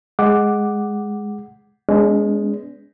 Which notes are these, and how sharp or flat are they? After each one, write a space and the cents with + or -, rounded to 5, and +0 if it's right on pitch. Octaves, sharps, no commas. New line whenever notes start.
G#3 +0 F#5 +5 D6 +0
G#3 +0 B3 +0 D4 -45